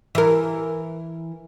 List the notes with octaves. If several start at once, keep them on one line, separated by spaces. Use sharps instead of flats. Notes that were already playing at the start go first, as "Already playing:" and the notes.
E3 A#4